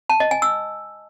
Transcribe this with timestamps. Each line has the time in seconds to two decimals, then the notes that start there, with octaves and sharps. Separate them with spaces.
0.10 A5
0.20 D#5
0.31 G#5
0.42 E6